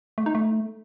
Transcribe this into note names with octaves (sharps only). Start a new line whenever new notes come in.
A3
D#4
A3